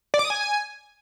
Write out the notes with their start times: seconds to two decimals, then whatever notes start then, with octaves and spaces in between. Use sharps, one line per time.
0.14 D5
0.19 D6
0.25 D#6
0.30 G#5